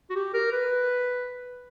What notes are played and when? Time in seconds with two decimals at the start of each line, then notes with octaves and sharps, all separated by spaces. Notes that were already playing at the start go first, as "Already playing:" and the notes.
0.10 F#4
0.15 G4
0.34 A#4
0.52 B4